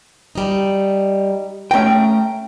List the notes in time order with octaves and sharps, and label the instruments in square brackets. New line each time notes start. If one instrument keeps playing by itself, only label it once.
[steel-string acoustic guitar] G3 D#4
[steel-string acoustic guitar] A3 A#5 [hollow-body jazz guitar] C#4 G5